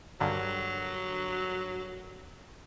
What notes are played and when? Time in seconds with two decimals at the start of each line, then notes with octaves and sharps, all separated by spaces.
0.20 G2 D3 F#3 A#4